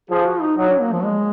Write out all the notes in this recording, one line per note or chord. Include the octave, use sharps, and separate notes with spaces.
F3 G#4
F#4
D#4
F#3 D#4
D4
A#3
F3
G#3